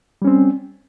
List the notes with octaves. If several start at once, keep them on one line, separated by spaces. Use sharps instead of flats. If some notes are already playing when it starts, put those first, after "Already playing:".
G3 C4 C#4